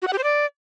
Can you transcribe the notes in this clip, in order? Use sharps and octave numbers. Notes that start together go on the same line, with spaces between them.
F#4
F#5
G4
C5
D5